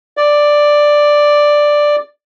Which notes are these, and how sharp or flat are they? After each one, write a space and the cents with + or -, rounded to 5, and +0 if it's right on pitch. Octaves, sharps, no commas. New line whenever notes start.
D5 +5